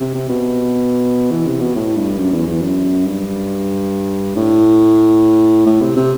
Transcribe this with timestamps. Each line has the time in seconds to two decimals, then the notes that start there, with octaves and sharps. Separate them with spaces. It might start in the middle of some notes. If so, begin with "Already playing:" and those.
0.01 C3
0.15 C3
0.29 B2
1.31 E3
1.46 C3
1.60 B2
1.75 A2
1.96 G2
2.18 F#2
2.33 E2
2.47 E2
2.62 F#2
3.06 G2
4.36 A2
5.66 A2
5.81 C3
5.97 C3